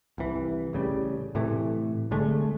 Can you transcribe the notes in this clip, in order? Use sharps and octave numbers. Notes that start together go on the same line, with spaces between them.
C2 E3
A1 C#3 G3
A2 C3 E3 A3
C2 D3 G#3 A3